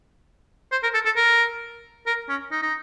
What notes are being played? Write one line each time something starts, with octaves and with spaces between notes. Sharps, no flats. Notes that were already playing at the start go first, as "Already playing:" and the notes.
C5
A#4
A4
A4
A#4
A#4
C#4
D#4
D#4